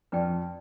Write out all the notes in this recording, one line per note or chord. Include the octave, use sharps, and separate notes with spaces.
F2 B4 D5 G5